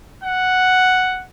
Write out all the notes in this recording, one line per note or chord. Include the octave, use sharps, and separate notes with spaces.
F#5